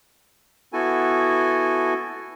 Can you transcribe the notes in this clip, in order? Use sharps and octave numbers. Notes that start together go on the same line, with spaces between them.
B3 E4 F#4 A4 G#5